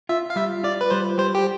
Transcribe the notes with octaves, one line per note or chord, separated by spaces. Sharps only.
F4 E5
F5
G3 E5
F4 D5
B4
G3 C5
G3 C5
G4